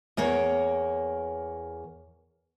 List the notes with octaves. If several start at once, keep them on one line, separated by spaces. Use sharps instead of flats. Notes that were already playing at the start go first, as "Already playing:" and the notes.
E2 A#3 A#4 C#5